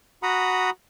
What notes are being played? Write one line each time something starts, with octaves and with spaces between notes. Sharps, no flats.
F#4 F#5 A#5 B5 D#6